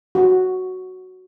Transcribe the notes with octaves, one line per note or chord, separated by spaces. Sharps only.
F#4